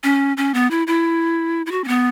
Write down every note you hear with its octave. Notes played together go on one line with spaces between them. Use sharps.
C#4
C#4
B3
E4
E4
E4
F#4
C#4
B3